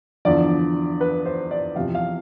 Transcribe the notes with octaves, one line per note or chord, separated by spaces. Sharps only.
E2 D3 F3 D5
B4
C5
D5
E2 C3 F3 F5
F5